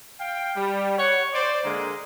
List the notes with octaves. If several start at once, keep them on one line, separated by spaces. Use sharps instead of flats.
F5 G5
G3
C#5 F#5
C5 D5
D3 G#3 A#3